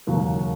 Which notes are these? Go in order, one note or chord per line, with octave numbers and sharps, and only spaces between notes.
E1 D#2 C#3 F#3 A#3